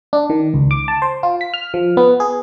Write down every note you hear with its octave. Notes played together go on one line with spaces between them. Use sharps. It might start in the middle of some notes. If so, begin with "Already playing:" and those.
D4
D#3
C#2
D6
A5
C5
F4
B6
F6
F3
B3
G#4